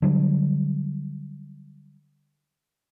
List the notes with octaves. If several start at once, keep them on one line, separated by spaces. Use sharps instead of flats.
D3 F#3 G3